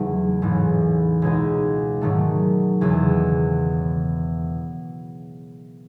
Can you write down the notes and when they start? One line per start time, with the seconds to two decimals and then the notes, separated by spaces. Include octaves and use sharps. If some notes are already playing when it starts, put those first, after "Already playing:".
Already playing: E2 C#3 F#3 A3 D#4
0.42 A1 G#2 E3
1.22 C#2 B2 G#3 D#4
2.01 G#2 D#3 F#3 A3
2.81 E1 E2 C#3